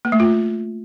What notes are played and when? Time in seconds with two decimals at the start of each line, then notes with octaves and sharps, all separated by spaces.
0.05 A#3
0.12 A3
0.20 F4